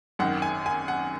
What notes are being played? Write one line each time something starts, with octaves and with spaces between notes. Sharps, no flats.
G#1 F#2 D#3 F#5
G#5
G#5
F#5